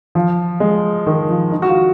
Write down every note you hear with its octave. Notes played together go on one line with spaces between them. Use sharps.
F3
G#3
D#3
F3
D#4
F#4
F4